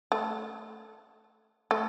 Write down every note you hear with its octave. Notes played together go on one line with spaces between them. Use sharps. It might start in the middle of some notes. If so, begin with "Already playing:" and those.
A3
A3